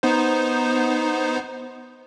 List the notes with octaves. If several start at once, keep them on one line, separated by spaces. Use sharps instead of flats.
B3 D#4 C5